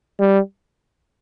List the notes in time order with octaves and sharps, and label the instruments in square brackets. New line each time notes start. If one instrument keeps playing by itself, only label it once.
[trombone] G3